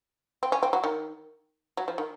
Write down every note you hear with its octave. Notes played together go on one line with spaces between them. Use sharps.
C4
C#4
C4
F#3
D#3
F#3
F3
D#3